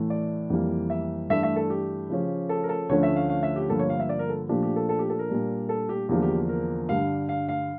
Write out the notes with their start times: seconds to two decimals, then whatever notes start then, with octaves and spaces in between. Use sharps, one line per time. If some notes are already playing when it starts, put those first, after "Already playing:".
Already playing: A2 E3 A3
0.10 D5
0.50 F2 E3 G3 A#3
0.90 E5
1.30 G2 E3 A3 D4 E5
1.43 E5
1.56 A4
1.70 G4
2.10 C#3 F3 C#4
2.49 A4
2.64 A#4
2.69 A4
2.89 D2 D3 F3 A3 C#4 C#5
3.03 E5
3.16 F5
3.29 F5
3.43 E5
3.56 G4
3.69 G2 D3 F3 A#3 A4
3.79 C#5
3.89 F5
4.00 E5
4.09 D5
4.19 A#4
4.29 A4
4.49 A#2 F3 A3 D4 G4
4.63 G4
4.76 A4
4.89 A4
4.99 G4
5.10 A4
5.19 A#4
5.29 A#2 G3 D4
5.69 A4
5.89 G4
6.09 E2 D3 F3 A#3 D4 G4
6.22 G4
6.49 A#4
6.89 G2 D3 G3 D4 F5
7.29 F5
7.48 F5